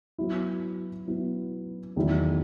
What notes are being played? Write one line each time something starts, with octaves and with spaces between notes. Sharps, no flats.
F#3 B3 E4
F#3 B3 E4
E2 D#3 F#3 A3 E4